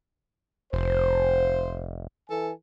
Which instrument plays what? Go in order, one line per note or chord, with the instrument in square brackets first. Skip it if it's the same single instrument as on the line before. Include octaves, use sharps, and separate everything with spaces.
[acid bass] F1 [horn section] C5
[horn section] E3 A4 G#5